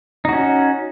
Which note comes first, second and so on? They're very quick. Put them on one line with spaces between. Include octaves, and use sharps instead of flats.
D#4 F#4 C#4